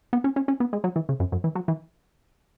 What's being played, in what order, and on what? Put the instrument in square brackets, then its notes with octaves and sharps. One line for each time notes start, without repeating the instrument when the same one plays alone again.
[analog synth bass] B3
C#4
C#4
C#4
B3
G#3
F#3
E3
C#3
F#2
F#2
E3
F#3
E3